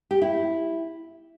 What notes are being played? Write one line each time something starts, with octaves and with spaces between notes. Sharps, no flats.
G4
E4